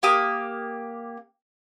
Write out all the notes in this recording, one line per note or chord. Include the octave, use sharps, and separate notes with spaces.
A#3 G4 D#6